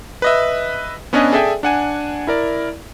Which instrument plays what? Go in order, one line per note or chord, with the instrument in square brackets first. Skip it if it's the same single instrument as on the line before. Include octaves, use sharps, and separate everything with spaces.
[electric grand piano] B4 D#5 E5
B3 C#4 D4 B4 D#5 G#5
G#4 A4 D5 E5 G5 G#5
D4 F#5 G#5
E4 A#4 D5